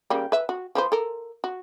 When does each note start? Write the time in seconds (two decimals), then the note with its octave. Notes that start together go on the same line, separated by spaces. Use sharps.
0.10 C#3 G3 A#3
0.32 B4 E5
0.49 F#4
0.75 F3 B4 C5
0.92 A4 A#4
1.44 F#4